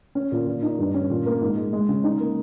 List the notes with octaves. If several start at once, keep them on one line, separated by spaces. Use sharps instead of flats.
C#4
A#2
A#2
D#4
G2
C#4
A#2
A#3
G#2
G#3
G#3
C#3
D#4
A#3